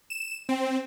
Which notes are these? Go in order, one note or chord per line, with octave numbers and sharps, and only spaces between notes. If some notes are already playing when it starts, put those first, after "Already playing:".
E7
C4